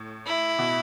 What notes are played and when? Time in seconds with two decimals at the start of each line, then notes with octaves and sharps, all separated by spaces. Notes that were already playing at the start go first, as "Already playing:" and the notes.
Already playing: A2
0.27 E4
0.59 B2